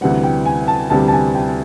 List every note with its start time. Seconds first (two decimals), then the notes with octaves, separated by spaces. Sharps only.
0.01 D2 C3 E3 G3 F#5
0.23 G5
0.46 G#5
0.68 A5
0.90 D2 C3 E3 G3 A5
1.08 A5
1.13 G#5
1.35 G5